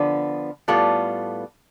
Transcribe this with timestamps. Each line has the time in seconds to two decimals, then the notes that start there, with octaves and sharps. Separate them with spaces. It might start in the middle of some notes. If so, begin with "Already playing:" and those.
Already playing: D3 F3 B3
0.68 A2 G3 B3 F4 A4